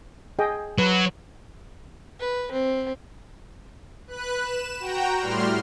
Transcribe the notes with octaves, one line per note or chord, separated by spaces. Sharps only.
G#4 D#5 G5
F#3 B4
B4
C4
B4 F#6
E7
F#4 G5 A#5
A2 G3 C6 F6